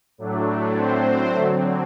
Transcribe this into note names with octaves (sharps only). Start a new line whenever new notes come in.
A2 F#3 A3 D4
C4 C5
D3 F#3 A3 C4 A4